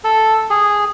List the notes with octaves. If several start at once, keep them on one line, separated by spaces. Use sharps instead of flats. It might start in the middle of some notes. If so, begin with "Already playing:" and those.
A4
G#4